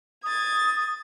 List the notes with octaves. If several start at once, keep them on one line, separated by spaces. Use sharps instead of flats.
D#6 G#6 A6